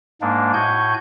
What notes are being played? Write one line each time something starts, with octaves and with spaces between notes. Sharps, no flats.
G#2 G#3 A#3 D4
A2 F#4 G#5 G6